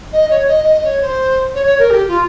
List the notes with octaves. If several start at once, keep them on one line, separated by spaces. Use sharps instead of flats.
D#5
C#5
D#5
D#5
C#5
C5
C#5
C#5
A#4
G4
F4